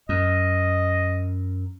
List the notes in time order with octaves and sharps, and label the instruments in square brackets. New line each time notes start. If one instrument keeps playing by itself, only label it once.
[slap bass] F#2 [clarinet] D#5